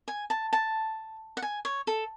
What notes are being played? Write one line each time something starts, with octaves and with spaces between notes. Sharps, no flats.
G#5
A5
A5
F#5
G#5
C#5
A4